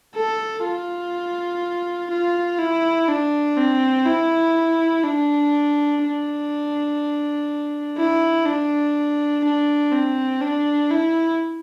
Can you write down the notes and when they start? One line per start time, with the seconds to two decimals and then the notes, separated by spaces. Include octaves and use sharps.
0.15 A4
0.64 F4
2.11 F4
2.59 E4
3.08 D4
3.57 C4
4.06 E4
5.04 D4
6.02 D4
7.98 E4
8.46 D4
9.44 D4
9.92 C4
10.41 D4
10.91 E4